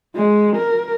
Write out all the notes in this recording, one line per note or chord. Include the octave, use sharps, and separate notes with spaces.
G#3
A#4